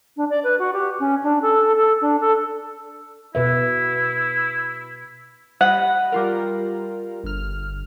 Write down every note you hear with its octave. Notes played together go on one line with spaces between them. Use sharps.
D4
D5
B4
F#4
G4
C#4
D4
A4
A4
D4
A4
B2 E4 B4 E5
G3 D#5 F#5 B5
G3 F4 A#4
G1 F6